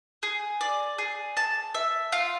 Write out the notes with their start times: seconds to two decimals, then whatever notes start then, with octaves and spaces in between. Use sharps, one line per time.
0.23 G#4
0.61 D5
0.99 G#4
1.37 A5
1.74 E5
2.12 F4